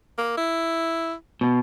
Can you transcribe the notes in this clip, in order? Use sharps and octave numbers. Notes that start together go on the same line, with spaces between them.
A#3
E4
B2